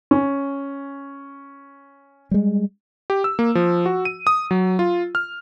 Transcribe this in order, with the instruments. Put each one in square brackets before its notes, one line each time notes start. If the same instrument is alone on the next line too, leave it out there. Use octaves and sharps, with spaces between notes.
[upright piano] C#4
[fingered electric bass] G3 G#3
[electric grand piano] G4
E6
A#3
F3
F#4
D#7
D#6
F#3
F4
F6